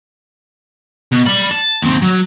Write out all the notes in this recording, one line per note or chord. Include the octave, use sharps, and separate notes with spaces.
B2
D5 B5
A5
D#2 C4
F#3